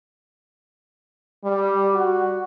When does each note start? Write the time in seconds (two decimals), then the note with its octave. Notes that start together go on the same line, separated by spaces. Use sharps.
1.44 G3
1.95 F#4